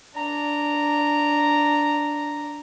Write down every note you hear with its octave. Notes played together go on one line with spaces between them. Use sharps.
D4 A#5